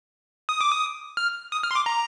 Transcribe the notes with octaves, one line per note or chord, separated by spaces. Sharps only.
D#6
D6
D#6
F6
D#6
F6
C6
D6
A#5